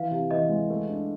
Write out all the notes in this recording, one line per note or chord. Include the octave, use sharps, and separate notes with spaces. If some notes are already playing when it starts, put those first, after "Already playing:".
Already playing: E3 F5
C3
E3 D#5
G#3
A3
D4